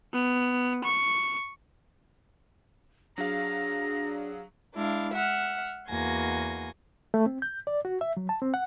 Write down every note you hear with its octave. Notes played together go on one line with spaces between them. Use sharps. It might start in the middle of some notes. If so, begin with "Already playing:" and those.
B3
C#6
F#3 D4 G#4 F5 A#5
G#3 D4 E4 F5
E5 F#5 F6
E2 A#3 F#4 G#5 C6 A#6
A3
C4
G6
D5
F#4
E5
F#3
A5
C4
F#5